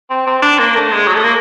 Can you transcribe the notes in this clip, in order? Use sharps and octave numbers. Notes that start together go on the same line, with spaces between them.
C4
C4
D4
A#3
A3
G#3
F#3
A3
A#3